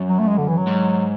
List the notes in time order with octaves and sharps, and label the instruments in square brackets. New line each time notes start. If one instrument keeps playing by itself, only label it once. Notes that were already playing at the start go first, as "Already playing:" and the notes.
Already playing: [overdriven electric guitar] F#2
[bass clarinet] F#3
A3
G#3
D3
E3
F#3
[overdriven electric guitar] G#2